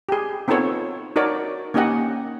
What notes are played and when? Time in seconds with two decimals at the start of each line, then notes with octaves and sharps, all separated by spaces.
0.09 G4 G#4
0.48 B3 C4 D#4 F4 A4 C#5
1.16 D#4 F#4 A#4 C#5 D5
1.74 A#3 C#4 D#4 G4 D#5 F#5